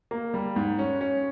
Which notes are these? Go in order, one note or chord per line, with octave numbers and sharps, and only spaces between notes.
A#3
G3
G#2
C#4
C#4